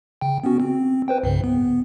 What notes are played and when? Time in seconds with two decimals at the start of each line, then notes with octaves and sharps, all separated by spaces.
0.21 C#3 G5
0.44 B3 C#4 F#4
0.60 C4
1.08 B4 C5 G5
1.24 C2 G2 C#3
1.44 B3